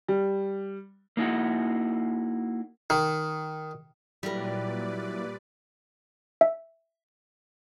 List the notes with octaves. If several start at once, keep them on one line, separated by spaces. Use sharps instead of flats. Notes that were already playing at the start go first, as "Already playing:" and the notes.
G3
A#3 D#4 E4 F#4
D#3
A#2 F#3 G3 E4 A#4 B4 D5
E5